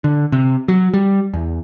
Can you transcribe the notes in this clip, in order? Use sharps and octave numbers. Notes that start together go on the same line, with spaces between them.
D3
C3
F#3
G3
E2